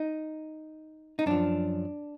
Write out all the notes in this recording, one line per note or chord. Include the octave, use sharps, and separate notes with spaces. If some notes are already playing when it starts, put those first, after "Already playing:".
Already playing: D#4
D#4
F#2 F3 D4